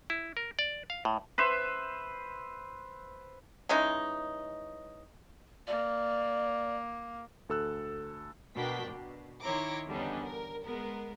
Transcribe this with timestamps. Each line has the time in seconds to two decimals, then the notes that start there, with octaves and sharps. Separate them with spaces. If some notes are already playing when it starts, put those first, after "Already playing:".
0.10 E4
0.37 A#4
0.59 D5
0.90 F5
1.05 A2
1.38 B4 C5 E5
3.69 E3 G#3 C#4 D#4
5.67 A#3 D5
7.49 D2 A4 E6 F#6
8.55 B2 D4 A#4 G5 B6
8.88 B2
9.42 D#3 E4 C#5 A#5 C6 D6
9.87 E2 D3 G3 B3 C#4 D#4
10.22 A#4
10.63 G#3 B3 A#4